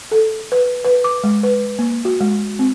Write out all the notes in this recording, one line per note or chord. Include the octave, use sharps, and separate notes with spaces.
A4
B4
B4
D6
G#3
B4
A#3
F#4
G#3
C4